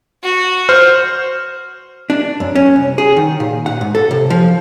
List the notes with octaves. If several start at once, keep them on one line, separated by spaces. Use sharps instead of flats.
F#4
C5 F6
D4
F#2
C#4
C2
G#4
D#3
A#2
F#5
G#2
A4
C3
F3